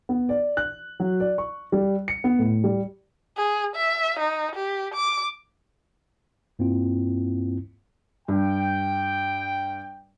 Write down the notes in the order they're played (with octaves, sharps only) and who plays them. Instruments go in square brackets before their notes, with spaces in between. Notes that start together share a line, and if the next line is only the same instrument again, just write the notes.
[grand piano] B3
D5
F#6
F#3
D5
C#6
G3
C#7
B3
A2
G3
[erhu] G#4
E5
D#4
G4
D6
[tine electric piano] G2 A#3 C4 E4 F4
[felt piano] G2 [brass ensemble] G5